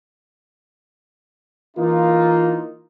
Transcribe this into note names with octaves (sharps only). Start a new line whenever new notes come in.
E3 A#3 D#4 F4